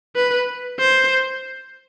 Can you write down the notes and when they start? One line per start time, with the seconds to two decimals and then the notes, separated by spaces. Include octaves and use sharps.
0.16 B4
0.80 C5